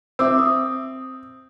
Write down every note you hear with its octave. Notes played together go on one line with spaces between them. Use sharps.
C4 E5 D6 E6
D#6